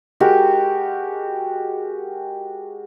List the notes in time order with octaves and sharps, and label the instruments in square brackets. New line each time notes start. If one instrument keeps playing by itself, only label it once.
[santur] G#3 F#4 G4 A#4